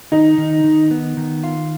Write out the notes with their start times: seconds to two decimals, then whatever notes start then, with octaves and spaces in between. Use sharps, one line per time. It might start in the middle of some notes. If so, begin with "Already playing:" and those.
0.12 D#3 D#4
0.38 D#3
0.64 D#3
0.91 B3
1.17 D#3
1.44 F4